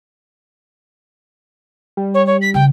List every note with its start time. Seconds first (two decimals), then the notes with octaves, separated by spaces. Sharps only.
1.97 G3
2.14 C#5
2.26 C#5
2.41 B6
2.54 C#3 G5